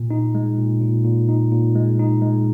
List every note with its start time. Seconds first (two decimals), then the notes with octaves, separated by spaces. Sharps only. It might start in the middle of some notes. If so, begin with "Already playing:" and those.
Already playing: A#2
0.11 D#4
0.35 G#3
0.58 A#2
0.82 A#2
1.05 A#2
1.29 D#4
1.52 A#2
1.75 G#3
1.99 D#4
2.22 G#3